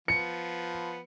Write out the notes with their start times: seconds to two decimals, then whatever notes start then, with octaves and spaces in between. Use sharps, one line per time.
0.08 F3 B3 C#7